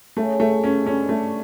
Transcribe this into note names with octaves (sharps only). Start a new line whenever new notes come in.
C#3 A3
A3
C#4
D3 C#4
A3